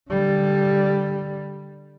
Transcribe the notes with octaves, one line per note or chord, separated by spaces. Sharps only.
D3 G3